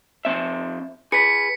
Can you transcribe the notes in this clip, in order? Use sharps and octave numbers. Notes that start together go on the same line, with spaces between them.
F2 C4 E5
G#4 B4 B6 C#7